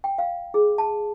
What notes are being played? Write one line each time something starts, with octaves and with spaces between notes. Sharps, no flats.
G5
F5
G#4
A5